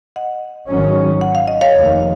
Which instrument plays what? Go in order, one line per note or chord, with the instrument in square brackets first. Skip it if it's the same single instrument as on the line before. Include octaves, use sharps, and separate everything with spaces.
[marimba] D#5 F#5
[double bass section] G#1 G#2 D#3 F#3 C#4
[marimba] F#5
F5
D#5
C#5 F5
[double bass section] F1 D#2 D#3